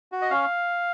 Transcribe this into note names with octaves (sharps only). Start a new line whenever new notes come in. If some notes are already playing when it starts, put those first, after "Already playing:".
F#4
D#5
C#4 F5